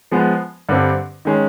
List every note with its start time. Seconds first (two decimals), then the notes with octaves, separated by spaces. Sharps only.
0.11 F3 G#3 B3
0.69 G2 D3 G3 C4
1.25 D#3 G#3 C#4